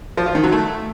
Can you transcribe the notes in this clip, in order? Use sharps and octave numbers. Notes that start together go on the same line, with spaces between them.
F3
F4
D#3
F#3
A3